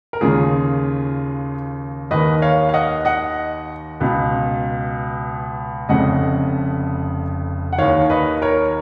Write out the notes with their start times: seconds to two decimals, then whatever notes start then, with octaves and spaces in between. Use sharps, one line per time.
0.13 A#4
0.21 D#2 C#3 F4 G#4
2.11 D#2 D#3 B4 D#5
2.42 C#5 F5
2.69 F5
2.74 D#5 F#5
3.05 D#5 F#5
4.00 C#2 B2
5.89 F1 F2 C#3 D#5 F#5
7.73 F#5
7.78 D#2 D#3 C#5 F5
8.10 B4 D#5
8.42 A#4 C#5